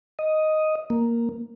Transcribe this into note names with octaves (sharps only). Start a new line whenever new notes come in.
D#5
A#3